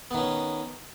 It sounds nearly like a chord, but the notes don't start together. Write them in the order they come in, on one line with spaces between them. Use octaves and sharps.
B3 D#3 C#4